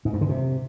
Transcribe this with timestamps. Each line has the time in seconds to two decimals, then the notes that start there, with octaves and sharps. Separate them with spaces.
0.05 G#2
0.13 G2
0.21 D3
0.29 C3